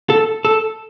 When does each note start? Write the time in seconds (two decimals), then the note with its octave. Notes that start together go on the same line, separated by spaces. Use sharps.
0.10 A4
0.45 A4